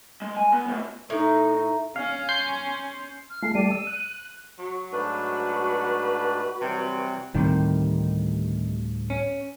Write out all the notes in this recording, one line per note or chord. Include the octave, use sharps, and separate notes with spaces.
G#3
G#5
B3
A2 B3
A2 D#4 E5 A#5
C#4 F5
C6 G6 C7
F6
G#3 A3 F4 C7
G3 A3 D5 D#7
E6
F#6
F#3 F#4
G#2 A3 D4 B4
C3 E3 F#3 G3
D2 A2 C3 D#3 G3
C#4